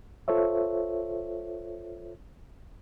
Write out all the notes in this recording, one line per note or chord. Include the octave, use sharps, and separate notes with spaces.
F4 A4 C5 C#5 E5